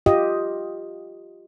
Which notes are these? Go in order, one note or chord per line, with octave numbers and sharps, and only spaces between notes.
F4 G4 D#5